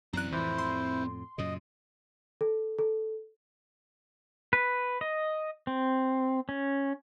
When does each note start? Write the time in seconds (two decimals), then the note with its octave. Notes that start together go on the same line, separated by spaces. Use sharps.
0.13 F#2 E3 C4 D5 A#5 F#6
0.32 F2 A2 E3 E4 C5
0.58 C6
1.38 F#2 A#2 C#3 D#5
2.41 A4
2.79 A4
4.53 B4
5.01 D#5
5.67 C4
6.49 C#4